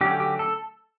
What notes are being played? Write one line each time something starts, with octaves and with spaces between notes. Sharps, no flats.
D3 F#3 A3 C#4 G4
G4
A4